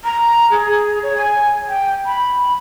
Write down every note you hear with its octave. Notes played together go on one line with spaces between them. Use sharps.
A#5
G#4
C#5
G#5
G5
B5